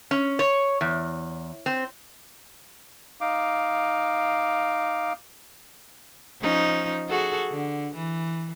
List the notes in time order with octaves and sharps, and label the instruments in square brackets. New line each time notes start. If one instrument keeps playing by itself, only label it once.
[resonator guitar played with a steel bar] C#4
C#5
E2
C4
[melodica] D#4 F5 D6
[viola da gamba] F3 C#4 D#4
F#4 G#4 A4
D3
E3